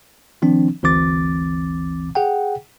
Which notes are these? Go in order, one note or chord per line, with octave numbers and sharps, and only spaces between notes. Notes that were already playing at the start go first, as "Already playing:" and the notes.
D#3 F3 C4 D4
G1 D2 E3 C4 D6 A6
G#4 F#5 G5